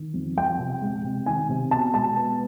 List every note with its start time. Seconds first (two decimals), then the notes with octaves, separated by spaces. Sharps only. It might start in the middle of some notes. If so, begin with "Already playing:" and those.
Already playing: D#3
0.14 F2
0.37 F2 G5
0.59 C3
0.81 G#3
1.04 C3
1.26 D#3 G#5
1.49 C3
1.71 B2 A5
1.94 G#3 A5
2.16 B3